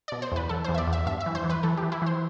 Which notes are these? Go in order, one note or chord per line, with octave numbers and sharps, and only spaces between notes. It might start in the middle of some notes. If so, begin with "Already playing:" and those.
B2 D5
C5
E2 B4
E2 A4
E2 C5
E5
D5
E2
E5
G2 E5
E5
E3
C5
E3
B4
E3 A4
G4
E3
E4
E3 C5